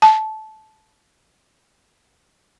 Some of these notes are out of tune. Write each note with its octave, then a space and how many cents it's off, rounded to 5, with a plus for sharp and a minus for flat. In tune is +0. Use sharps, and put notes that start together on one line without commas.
A5 -15